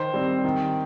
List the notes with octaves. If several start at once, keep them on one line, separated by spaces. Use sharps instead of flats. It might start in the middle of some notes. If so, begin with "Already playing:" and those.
Already playing: D#3 C5
G3 C4
D#3